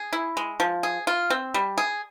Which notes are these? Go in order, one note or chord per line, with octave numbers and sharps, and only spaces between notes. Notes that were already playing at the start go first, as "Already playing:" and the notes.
Already playing: G#4
E4
G#3
F3
G#4
F4
C4
G3
G#4